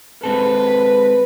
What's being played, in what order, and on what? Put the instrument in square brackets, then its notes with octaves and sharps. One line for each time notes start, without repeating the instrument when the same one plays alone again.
[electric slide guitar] G#3 C4 A4 [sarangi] B4